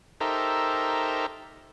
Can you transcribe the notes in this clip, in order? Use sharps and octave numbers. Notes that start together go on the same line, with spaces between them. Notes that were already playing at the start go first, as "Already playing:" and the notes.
D#4 G4 A4 A#4 C5 E5